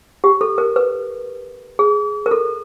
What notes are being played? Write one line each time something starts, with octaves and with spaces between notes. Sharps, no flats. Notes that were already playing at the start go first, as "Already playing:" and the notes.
G4
A4
A#4
B4
G#4
A#4
A4